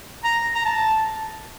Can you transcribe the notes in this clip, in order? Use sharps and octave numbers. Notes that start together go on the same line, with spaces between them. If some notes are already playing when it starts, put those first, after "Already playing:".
A#5
A#5
A5